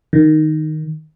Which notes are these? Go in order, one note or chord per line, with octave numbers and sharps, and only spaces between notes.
D#3